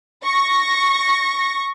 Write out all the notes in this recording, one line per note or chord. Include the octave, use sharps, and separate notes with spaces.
C#6 A#6